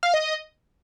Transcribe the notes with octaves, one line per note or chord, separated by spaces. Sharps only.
F5
D#5